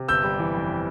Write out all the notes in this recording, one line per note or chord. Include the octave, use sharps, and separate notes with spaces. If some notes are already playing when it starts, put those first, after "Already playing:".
Already playing: C3
G1 E6 G6
G3
E3
F2